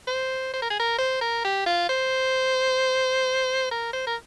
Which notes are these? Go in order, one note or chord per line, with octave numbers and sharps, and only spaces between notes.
C5
C5
A#4
G#4
A#4
C5
A#4
G4
F4
C5
A#4
C5
A#4